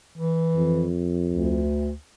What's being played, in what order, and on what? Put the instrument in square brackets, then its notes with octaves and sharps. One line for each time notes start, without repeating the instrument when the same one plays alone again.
[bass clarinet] E3
[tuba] F2
[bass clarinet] D2